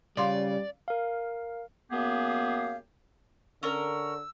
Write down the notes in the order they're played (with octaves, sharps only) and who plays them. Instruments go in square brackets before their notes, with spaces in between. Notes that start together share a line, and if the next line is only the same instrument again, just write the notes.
[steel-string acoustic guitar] C#3 C#4 F4 [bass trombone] G3 [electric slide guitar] D5 [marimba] F5 C6 D6
[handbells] A#4 F5
[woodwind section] F#2 A#3 B3 G4 G#4 F5
[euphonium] D3 [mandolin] C#4 A#4 [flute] E6